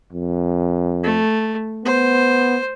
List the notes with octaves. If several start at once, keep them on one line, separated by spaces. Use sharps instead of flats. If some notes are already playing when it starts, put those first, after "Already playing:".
F2
A3
B3 C5